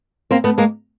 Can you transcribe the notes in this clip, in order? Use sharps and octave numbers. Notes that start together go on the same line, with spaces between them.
A#3 C4
A3 B3
G#3 A#3